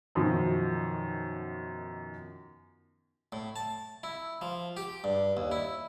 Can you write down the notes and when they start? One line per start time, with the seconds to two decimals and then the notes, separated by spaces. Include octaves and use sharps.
0.15 F#2 B2 D#3 F3
3.32 A2
3.56 A5
4.03 E4
4.41 F3
4.77 G4
5.04 G2
5.37 D#2
5.52 E4